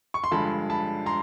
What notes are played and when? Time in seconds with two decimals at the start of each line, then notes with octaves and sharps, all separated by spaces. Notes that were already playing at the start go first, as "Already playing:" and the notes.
0.14 C#6
0.24 C6
0.31 G2 D3 F3 G#3 A5 B5
0.70 A5 B5
1.06 A#5 C6